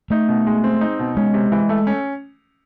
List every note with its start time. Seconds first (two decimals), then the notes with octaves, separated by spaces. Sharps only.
0.10 A3 D#4
0.29 B2
0.47 G#3
0.64 C4
0.81 D#4
0.99 B2
1.17 G#3 C#4
1.34 C3
1.52 E3
1.69 A3
1.87 C#4